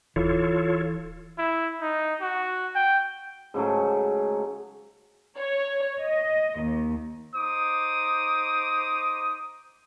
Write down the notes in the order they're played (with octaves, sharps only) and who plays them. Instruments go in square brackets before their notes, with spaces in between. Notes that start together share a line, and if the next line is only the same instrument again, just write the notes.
[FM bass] D1 [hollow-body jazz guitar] E3 [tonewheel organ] F4 A4 C#5
[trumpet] E4
D#4
F#4
G5
[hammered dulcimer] G#2 C#3 F#3 A3
[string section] C#5
D#5
D#2
[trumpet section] D#4 C5 D6 D#6